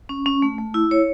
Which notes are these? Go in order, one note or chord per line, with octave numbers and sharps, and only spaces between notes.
C#4
C#4
A3
A3
E4
C#5